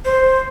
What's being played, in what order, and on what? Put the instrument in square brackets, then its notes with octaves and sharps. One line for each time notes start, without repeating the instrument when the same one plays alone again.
[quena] C5